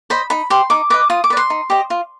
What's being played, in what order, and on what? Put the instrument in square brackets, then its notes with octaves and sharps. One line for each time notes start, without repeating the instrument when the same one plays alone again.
[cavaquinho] C5 D#5 B5
D#4 B5
G4 C5 C6
D#4 D6
B4 D#5 D6
F4 D#6
D6
B4 D5
C6
D#4
G4 C5 D#5
F4